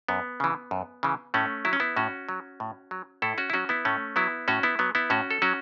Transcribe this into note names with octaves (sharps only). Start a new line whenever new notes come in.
F#2 B3
C#3 E3
F#2
C#3 E3
A2 A3 C#4
F#3 E4
C#4
B3 E4
A2 C#4 F#4
F#3
A2
F#3
A2 E4 A4
C#4 F#4
E4
F#3 C#4 F#4
B3 E4
A2 A3 C#4
F#3 B3 E4
A2 C#4 F#4
B3 E4
F#3 B3
B3 E4
A2 C#4 F#4
A4
F#3 C#4 F#4